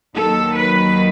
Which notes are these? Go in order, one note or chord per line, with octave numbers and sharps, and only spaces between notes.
D#2 D#3 F#3 A4
B4